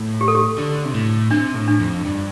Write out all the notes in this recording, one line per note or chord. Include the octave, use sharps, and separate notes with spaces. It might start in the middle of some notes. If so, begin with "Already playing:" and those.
Already playing: A2
G4
A4
G4
D3
C3
A2
C3 D4
A2
D4
F2
G2